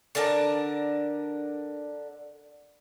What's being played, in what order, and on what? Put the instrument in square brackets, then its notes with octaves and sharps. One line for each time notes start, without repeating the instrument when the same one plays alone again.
[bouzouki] D3 D4 A#4 A5